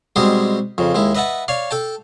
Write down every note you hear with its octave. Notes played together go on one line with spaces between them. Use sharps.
B2 G3 G#3 C4 G4 G#4
F2 C#3
D#2 G#3 E4
B4 D#5 E5 F#5 A5
C#5 D5 F5
A4 G5 A5